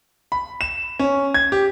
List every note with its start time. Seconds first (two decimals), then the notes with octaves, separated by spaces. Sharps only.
0.32 B5
0.61 E7
0.99 C#4
1.34 G#6
1.52 G4